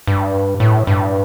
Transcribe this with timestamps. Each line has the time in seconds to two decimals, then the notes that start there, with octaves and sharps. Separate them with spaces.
0.07 G2
0.60 A2
0.87 G2